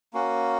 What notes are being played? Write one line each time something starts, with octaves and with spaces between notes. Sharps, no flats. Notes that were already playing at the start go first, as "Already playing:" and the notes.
A#3 C#4 F#4